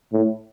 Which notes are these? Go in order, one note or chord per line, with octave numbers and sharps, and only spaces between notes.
A2